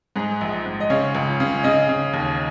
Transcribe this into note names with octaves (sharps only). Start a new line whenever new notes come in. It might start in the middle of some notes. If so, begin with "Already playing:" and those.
G#2 G#4
A#1
G#2
D#5
C#3 C#5
C#2
C#3
C#3 D#5
C#3
D#2